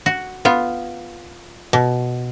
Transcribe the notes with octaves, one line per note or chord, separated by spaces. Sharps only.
F#4
B3 F4
B2